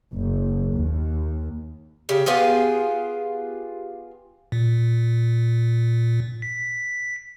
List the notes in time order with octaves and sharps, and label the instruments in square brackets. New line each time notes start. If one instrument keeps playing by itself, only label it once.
[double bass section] F#1
D#2
[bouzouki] C#3 G4
B3 F4 G4 G#4
[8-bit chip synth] A#2
B6